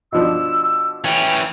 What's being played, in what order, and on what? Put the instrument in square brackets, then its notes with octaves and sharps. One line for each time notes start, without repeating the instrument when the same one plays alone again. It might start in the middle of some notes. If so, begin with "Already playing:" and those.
[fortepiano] B2 F3 D4 [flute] E6
[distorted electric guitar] E3 C#4 [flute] G5